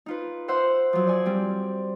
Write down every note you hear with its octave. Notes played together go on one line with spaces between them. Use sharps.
D#4 F4 B4
C5 E5 F#5 C6
F3 F#3
D5 G#5
G3 C4